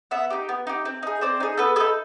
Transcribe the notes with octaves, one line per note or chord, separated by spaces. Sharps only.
B3 E5 F#5
D#4 G4
B3
D#4 G4
C4
D#4 G#4
C4 C5 D5
D#4 G#4
B3 A4 B4
D#4 G#4 A4 B4